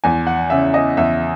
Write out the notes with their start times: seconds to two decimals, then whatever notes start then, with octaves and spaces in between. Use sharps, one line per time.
0.04 E2 G#5
0.27 F#5
0.50 C#3 E5
0.74 D#5
0.97 E2 E5